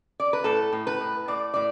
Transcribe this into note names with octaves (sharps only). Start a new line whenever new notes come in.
D5
B4
A2 A4
A2
B4
A2
A2 D5
A2 D5